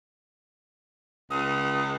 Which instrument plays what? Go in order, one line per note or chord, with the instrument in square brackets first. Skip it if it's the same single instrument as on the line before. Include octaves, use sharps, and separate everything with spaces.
[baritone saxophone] C#2 [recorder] D#6